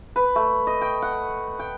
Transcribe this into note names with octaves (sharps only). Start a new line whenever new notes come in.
B4
A3
D#5
G5
F#5
G5